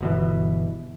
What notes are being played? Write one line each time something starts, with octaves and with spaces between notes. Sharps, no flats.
G1 B2 E3